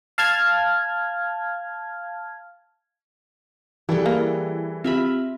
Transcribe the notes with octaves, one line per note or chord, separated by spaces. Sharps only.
F5 A5 F6 G#6
E3 G3 G#4 A4 G5 A5
A#3
C4 F4 G4 E5 B5